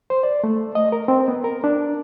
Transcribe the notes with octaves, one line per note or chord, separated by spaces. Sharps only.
C5
D5
A3
D#5
A#4
C4
B3
A#4
D4